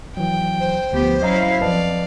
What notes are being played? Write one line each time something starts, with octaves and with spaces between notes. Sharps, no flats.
E3 F#3 G5
C5
D2 F3 B3 G4
F#3 C#4 E4 D#5 F5 A#5
F2 B4 D5 D#5 F5 A5